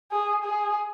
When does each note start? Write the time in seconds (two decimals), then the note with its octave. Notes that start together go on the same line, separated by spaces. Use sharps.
0.12 G#4
0.44 G#4